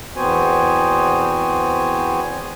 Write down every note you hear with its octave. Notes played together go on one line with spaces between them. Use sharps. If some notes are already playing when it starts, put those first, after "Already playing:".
E2 B3 C4 F#4 C5 G#5